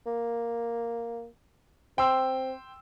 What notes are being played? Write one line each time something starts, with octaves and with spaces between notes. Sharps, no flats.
A#3
C4 G5 C6 E6